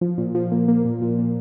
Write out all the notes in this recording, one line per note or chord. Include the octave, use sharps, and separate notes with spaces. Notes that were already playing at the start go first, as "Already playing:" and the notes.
F3
A#2
F3
A#3
A#3
A#2
A#2
A#2